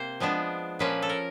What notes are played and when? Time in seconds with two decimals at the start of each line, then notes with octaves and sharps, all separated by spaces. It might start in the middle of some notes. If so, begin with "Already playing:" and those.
Already playing: C3 A#3 C5
0.20 F3 G#3 B3 D4
0.79 A#2 F3 A#3 C#4 B4
1.02 A4
1.09 A#4